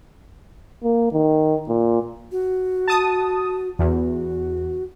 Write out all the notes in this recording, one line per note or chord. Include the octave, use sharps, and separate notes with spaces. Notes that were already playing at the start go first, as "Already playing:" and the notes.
A#3
D#3
A#2
F#4
A5 D#6
E2 F#4